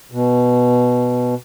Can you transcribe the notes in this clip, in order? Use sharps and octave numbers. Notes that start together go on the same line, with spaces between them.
B2